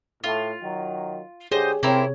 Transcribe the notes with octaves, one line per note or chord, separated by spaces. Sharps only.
A2 F4
D#3 F#3
D3 G4 G#4 C5 C#5 D#5
C3 A#3 C4 E4 A#4 C#5